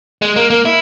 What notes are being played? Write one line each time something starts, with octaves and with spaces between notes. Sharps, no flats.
G#3
A#3
A#3
E4